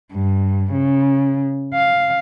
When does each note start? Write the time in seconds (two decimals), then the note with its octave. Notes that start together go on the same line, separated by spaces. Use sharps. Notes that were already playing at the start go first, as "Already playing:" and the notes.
0.14 G2
0.73 C#3
1.74 F5